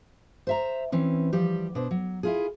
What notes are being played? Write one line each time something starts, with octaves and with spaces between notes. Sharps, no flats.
C5 E5 A#5
E3 C4 C#4
F3 G3 G4
B2 D4 C5
F#3
E4 F4 G#4